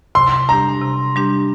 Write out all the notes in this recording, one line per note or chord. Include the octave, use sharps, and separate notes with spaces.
C3 C6
G3 D4 G4 A#5
C3
G3 D4 G4